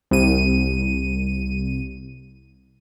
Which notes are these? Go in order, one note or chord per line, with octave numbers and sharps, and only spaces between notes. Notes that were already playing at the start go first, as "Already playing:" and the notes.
C2 D#7